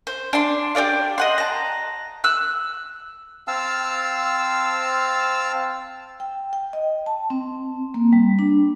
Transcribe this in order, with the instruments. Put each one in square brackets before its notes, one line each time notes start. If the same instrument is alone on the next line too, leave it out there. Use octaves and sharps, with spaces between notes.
[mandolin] C5
D4 C6
G4 A#4 D5 F5
D#5 F#5 C6
A5 A#5
E6 F#6
[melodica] C4 F5 A5 E6
[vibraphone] G5
G5
D#5
A5
C4
A#3
G3
D4